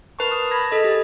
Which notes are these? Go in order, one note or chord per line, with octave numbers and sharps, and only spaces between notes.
A#4 B4 A5 C#6
D#6
A5 B5 G#6 A#6
G#4 A4 D#5 D#6
G4